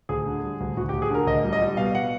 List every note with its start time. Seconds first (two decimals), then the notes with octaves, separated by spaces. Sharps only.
0.09 D2 G#4
0.26 D3
0.43 G3
0.60 D2
0.76 D2 F#4
0.89 D2 G4
1.02 G#4
1.10 D3 A#4
1.27 D2 D#5
1.44 G3
1.53 D#5
1.61 G3
1.77 B2 F5
1.95 F#5